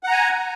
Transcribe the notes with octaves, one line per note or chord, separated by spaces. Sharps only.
F#5 G#5 A#5